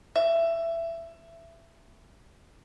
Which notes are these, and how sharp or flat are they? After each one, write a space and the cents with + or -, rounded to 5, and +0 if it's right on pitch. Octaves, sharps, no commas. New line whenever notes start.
E5 +15